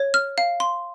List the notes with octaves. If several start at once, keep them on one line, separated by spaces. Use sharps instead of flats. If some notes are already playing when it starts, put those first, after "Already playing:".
Already playing: C#5
F6
F5
C6